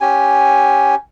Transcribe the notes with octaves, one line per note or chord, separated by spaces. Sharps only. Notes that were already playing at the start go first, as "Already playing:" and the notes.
C#4 G4 G#5